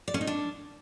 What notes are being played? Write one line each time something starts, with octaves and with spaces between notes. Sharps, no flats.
D5
C#4
D#4
D4